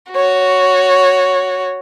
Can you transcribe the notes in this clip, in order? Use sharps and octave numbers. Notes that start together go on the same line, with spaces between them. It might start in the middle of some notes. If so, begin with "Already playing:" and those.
F#4 C#5